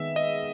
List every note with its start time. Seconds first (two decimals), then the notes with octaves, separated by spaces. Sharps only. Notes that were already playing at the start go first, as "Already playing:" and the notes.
Already playing: D#3 G#3 B3 E5
0.16 D#5